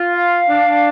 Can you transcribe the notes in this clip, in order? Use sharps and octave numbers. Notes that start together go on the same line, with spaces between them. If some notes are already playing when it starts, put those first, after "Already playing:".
Already playing: F4
F5
D4